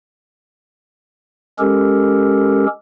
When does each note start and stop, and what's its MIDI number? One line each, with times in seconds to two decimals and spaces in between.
1.59 2.66 56
1.59 2.66 61
1.59 2.66 67
1.59 2.66 69
1.59 2.66 70